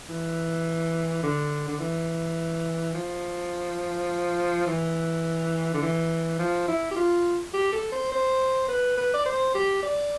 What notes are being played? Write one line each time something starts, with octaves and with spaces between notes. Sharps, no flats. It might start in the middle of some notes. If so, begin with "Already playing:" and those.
E3
D3
D3
E3
F3
E3
D3
E3
F3
E4
G4
F4
G4
A4
C5
C5
B4
B4
D5
C5
G4
D5